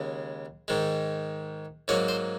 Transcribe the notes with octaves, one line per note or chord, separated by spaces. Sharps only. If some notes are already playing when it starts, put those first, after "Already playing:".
Already playing: D#2 C#3 G#3
G#2 D#3 G#3
G#2 F#3 A#3 C#5
C5